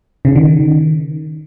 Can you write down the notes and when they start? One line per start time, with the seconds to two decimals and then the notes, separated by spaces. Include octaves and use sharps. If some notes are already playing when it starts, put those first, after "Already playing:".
0.25 C#3
0.36 D#3